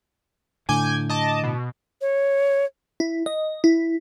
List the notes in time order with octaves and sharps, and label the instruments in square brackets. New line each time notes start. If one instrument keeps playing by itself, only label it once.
[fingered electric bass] A2 D3 [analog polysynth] G#5 D6 G6
[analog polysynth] D#5 A5 D6
B2
[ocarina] C#5
[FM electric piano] E4
D#5
E4